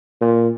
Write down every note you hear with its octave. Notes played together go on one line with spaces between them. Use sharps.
A#2